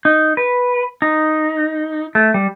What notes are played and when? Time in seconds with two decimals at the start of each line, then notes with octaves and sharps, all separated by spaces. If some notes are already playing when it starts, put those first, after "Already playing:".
0.05 D#4
0.37 B4
1.02 D#4
2.15 A3
2.34 G3